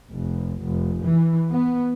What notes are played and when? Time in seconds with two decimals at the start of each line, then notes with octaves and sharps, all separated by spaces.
0.11 F1
0.63 F1
1.04 E3
1.52 B3